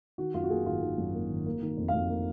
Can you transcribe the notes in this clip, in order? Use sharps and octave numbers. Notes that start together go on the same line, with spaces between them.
D#3 F#4
F#2 F4
F#4
A#3 G#4
G#1 F4
D#3
F#2
A#3
G#1
A#3
D#3
F2
F5
F2
A#3